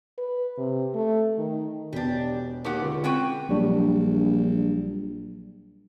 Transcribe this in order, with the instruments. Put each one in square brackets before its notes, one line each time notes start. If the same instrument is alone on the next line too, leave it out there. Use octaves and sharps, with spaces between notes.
[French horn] B4
C3
A3
D#3
[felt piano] E1 B2 [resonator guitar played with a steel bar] D4 G4
[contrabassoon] D#2 [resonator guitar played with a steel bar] G4 F#5
[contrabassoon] C#2 [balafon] D3
[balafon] C4 F4 C#6 [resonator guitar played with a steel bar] F#4 B4 G5
[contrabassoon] A#1 [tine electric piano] F#3 G3 D4